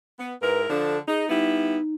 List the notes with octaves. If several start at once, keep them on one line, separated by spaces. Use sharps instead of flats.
B3
G#2 E4 A#4 B4
D3 F3 D4 A4
D#4 G#4
G3 B3 D#4 E4